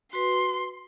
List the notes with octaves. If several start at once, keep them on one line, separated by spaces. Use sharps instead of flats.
F#4 B4 C6